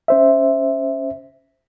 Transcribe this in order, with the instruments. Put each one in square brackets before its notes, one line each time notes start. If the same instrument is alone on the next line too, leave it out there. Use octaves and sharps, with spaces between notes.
[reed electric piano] C#4 C5 E5